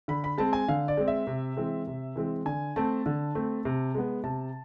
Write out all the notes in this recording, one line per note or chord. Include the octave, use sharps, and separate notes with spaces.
D3 B5
B5
G#3 C4 A5
G#5
D3 F5
D5
G#3 C4
E5
C3
E3 G#3 C4
C3
E3 G#3 C4
D3 G#5
A3 C4 A5
D3
A3 C4
C3
G#3 B3
C3 A5